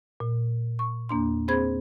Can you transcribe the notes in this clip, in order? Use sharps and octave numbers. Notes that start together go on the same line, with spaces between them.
A#2
C#6
E2 A#3 D4 C6
C4 G#4 C5 B5 G#6